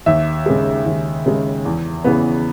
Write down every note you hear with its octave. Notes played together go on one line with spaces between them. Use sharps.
D#2 E5
C#3 G#3
D#2
C#3 G#3
E2
C#3 E3 B3